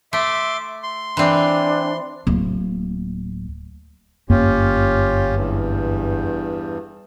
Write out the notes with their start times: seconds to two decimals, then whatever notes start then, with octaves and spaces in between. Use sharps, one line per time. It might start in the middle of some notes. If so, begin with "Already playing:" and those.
0.13 A3 E5 C6 D6
0.83 C6
1.17 E3 C4 D4
2.27 D1 A#3
4.30 G1 F#2 A#3 C#4 F4 G4
5.35 E2 G2 E3